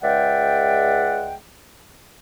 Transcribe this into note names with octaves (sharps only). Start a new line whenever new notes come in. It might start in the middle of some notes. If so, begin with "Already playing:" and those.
C#2 G#3 D5 E5 F#5 G5